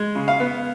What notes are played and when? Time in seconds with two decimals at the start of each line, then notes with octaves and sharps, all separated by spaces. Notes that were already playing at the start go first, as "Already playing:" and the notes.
Already playing: G#3
0.15 C#3
0.28 F5
0.40 B3